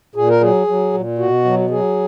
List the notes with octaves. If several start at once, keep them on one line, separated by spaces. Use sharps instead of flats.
A#2 G#4
A#4
F#3 G#4
F#3
A#2
B2 F#4
F#3
F#3 G#4